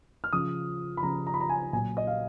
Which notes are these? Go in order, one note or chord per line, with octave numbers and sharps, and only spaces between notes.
F6
C#3 F3 D#6
B5
C#3 F3 A#5
A#5
B5
A#5
G#5
A#2 F#3 G#5
D#5
F5